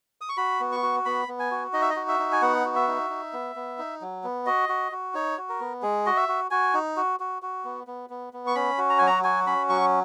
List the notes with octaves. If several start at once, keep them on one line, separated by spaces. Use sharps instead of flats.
D#6
C#6
F#4 B5
B3
C#6
F#4
B3 B5
B3
G#5
F#4
D#4 D#5
E5
D#5
F#4
E5
D#4
G#5
B3 F#5
F#4
E5
D#4
D#4
B3
B3
D#4
F#3
B3
F#4 D#5
F#4
F#4
D#4 C#5
F#4
A#4
B3
G#3 G#4
F#4 D#5
E5
F#4
F#4 G#5
D#4
F#4
F#4
F#4
B3
B3
B3
B3
C#6
C#4 B5
F#4
A#5
F#3 G#5
A#5
F#4 G#5
C#4 B5
F#3 C#6